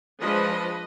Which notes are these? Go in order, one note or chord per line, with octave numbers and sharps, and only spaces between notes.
F3 G#3 D4 B4 D#5